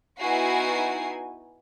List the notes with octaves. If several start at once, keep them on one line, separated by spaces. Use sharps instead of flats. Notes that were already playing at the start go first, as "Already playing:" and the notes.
B3 D#4 E4 F#4 G#5 C7